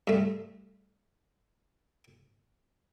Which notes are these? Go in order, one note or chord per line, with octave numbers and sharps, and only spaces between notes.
G2 A3